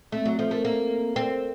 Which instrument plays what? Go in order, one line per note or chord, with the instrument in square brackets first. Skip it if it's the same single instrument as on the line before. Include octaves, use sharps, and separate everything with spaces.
[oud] A3 [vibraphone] C4
[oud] F#3
[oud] F3 [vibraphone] A4
[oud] A3 [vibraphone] A#4
[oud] A#3 [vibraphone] A4
[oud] C4